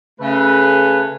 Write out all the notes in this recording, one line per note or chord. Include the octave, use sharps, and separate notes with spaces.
C#3 A3 B4